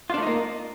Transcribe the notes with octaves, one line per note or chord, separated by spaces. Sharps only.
A3 A#3 D4 D#4 F4